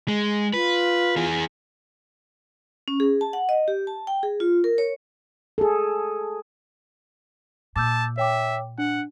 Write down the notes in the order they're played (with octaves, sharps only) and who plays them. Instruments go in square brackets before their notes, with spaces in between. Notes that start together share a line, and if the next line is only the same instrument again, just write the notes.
[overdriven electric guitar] G#3
[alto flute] F4 [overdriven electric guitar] B4
[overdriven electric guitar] E3 G#4
[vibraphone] C#4
G#4
A5
F#5
D#5
G4
A5
G5
G#4
F4
A#4
C#5
[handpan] G#4 A4
[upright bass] A#2 [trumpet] A5 [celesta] D6 E6 G6
[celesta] C#5 G5 D6 [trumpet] E5
[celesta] D4 [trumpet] F#5